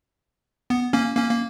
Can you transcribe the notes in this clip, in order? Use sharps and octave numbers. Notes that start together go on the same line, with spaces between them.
B3
A#3 C#4
A#3 C#4
A#3